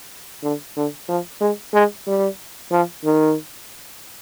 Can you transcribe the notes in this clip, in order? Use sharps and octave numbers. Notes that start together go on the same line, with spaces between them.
D3
D3
F3
G#3
G#3
G3
F3
D#3